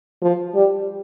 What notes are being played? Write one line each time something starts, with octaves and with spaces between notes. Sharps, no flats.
F3
G3